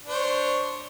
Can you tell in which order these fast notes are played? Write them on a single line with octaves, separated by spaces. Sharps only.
D4 C5 C#5